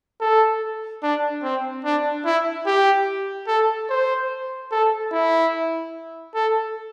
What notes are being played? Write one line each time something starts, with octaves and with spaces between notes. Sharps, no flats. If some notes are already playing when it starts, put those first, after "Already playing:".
A4
D4
C4
D4
E4
G4
A4
C5
A4
E4
A4